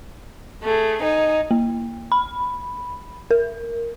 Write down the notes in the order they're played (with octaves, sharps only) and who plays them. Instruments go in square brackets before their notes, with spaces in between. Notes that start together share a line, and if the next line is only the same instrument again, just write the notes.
[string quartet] A3 G#4
D#4 G#5
[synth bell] A#3
B5
A#4